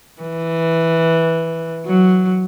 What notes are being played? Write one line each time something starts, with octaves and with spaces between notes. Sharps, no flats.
E3
F#3